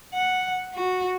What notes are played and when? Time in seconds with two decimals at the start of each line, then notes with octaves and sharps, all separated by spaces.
0.13 F#5
0.75 F#4